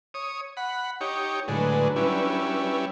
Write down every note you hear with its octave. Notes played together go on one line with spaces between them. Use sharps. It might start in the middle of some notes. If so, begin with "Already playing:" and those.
C#5 D#6
F#5 B5
D#4 G4 C#5
A2 D3 F#3 G#3 D4 B4
G3 C#4 E4